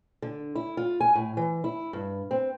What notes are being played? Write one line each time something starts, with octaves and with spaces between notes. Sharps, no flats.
D3
E4
F4
G#5
A2
E3
E4
G2
C4